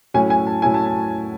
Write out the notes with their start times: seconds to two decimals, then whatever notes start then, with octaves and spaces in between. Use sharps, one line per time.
0.14 A2 F#3 C#4 E4 G#5
0.30 G#5
0.47 A5
0.62 A2 F#3 C#4 E4 G#5
0.74 A5
0.86 A5